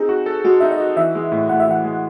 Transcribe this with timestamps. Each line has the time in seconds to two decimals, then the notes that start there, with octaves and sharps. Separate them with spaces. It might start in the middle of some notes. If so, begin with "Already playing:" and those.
Already playing: C4 D#4 G#4
0.09 F#4
0.26 A4
0.44 G#3 F#4
0.60 D#4 E5
0.71 D#5
0.80 F#4
0.96 E3 E5
1.15 G#3
1.32 A2
1.49 A2 F#5
1.60 E5
1.68 E3 F#5
1.85 G#3